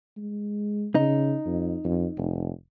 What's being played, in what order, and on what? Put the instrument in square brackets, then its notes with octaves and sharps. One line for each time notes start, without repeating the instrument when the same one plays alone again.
[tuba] G#3
[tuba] C#3 [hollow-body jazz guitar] D#4
[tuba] F2
F2
F1